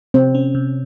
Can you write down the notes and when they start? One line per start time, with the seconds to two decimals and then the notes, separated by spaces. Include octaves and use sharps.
0.14 C3 C4
0.35 C#4
0.55 C3